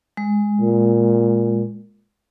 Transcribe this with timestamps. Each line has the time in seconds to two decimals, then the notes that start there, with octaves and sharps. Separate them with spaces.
0.17 G#3
0.61 A#2